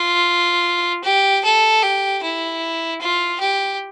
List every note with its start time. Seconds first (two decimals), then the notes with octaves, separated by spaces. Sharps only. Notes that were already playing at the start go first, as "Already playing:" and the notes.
Already playing: F4
1.04 G4
1.44 A4
1.82 G4
2.23 E4
3.01 F4
3.40 G4